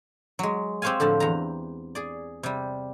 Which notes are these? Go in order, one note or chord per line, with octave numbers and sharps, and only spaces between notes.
F#3 G#3
C4 G4 C5 C#5 F5 G#5
A2 D3 F3 A5
E2 A#5
G#4 D5
C3 G3